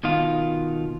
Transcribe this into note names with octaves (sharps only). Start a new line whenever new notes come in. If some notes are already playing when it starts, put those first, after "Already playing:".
B2 D#3 F4